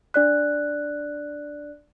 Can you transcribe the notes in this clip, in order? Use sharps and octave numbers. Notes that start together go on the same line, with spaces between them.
D4 D5 F#6